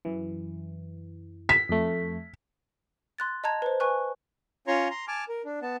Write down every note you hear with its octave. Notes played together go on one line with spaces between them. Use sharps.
F#2 E3
B6
F2 A3
C6 F#6 A6
D#5 A5 A#5 G#6
B4 C5
B4 G#5 C#6 F#6
C#4 F4 C#5 A#5 C6 C#6
A#5 C6
G#5 A5 D6 F6
A#4
D4
B3 A5